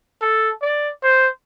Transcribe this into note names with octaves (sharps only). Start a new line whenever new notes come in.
A4
D5
C5